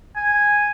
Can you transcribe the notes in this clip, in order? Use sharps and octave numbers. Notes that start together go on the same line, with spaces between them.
G#5